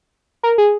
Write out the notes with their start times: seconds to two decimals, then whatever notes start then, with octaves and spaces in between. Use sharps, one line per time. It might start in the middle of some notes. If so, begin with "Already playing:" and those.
0.43 A#4
0.58 G#4